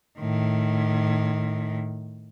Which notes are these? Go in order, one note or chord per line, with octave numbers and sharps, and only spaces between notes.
A2 D#3